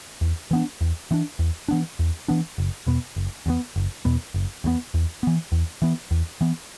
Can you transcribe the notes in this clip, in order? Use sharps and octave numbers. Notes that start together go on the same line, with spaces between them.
E2
E3 B3 D4
E2
E3 B3 D4
E2
E3 B3 D4
E2
E3 B3 D4
F#1
E2 B2 B3
F#1
E2 B2 B3
F#1
E2 B2 B3
F#1
E2 B2 B3
E2
E3 B3
E2
E3 B3
E2
E3 B3